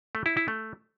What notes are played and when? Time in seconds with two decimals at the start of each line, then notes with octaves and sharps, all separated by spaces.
0.15 A3
0.26 E4
0.37 E4
0.48 A3